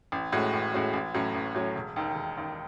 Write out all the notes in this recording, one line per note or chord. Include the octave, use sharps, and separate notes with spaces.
A1
A2 G#3 C#4 F#4
A1
A2 G#3 C#4 F#4
A1
A2 F#3 C#4
A1
A2 F#3 C#4
E1
D#2 D#3
E1
D#2 D#3